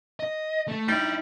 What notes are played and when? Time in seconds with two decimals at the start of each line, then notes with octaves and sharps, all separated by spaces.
0.20 D#5
0.68 A3
0.88 G3 D#4 E4